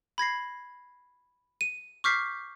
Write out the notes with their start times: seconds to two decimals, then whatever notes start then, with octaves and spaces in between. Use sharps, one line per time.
0.18 B5 G#6 A#6 C7
1.61 D#7
2.04 C#6 D6 F6 G6 B6 C7